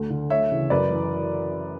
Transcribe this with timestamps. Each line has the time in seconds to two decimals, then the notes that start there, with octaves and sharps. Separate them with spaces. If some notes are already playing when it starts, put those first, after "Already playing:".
Already playing: D2
0.10 D3
0.30 D2 C#5 E5
0.51 C#3 E3
0.70 F#2 B4 D5
0.90 E3